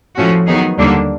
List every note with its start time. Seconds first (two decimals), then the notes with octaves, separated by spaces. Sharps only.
0.16 A2 F3 A3 C#4 F#4
0.47 D#3 F#3 B3 D#4 G#4
0.78 D#2 D3 G3 A#3 D4